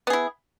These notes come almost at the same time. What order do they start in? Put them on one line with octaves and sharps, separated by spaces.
B3 G#4 E4